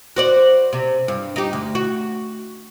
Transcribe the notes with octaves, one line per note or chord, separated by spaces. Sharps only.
F#4 C5 D5
C3
G2
D#4 G4
D2
F#4